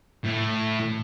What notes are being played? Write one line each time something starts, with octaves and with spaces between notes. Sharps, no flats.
A2